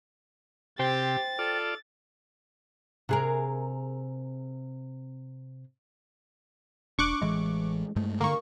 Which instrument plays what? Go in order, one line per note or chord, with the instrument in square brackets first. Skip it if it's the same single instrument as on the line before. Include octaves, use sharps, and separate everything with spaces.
[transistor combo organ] C3 [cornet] G4 [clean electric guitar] C5 G5 [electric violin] A6
[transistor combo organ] F4 D5 [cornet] A4
[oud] C3 G#4 A#4
[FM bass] E1 [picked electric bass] D4 [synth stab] C#6 D6 F#6
[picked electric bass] A1 E3 [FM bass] G#3
[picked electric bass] G2 G#3 A3
[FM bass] D3 [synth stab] A#3 C#6